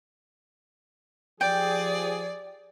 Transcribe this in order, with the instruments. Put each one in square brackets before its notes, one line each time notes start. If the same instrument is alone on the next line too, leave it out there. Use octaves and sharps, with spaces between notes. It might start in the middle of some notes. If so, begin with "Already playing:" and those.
[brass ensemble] F3 G4 G#4 [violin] D5 [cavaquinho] G5